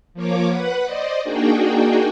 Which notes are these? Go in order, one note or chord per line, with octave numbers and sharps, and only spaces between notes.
F3 A#3 C#5 D6
B4 F#5 B5
C5 D5 D#5
A#3 D4 D#4 F#4 G#4 G5